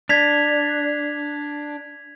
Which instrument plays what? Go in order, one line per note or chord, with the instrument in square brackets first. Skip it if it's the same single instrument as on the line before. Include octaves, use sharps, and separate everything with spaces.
[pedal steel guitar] D4 [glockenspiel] G#6 B6 F7